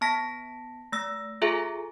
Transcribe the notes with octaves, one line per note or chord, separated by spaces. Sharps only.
B3 A5 A#6 B6
A3 E6 A#6
F4 G#4 A4 E5 G#5 A#5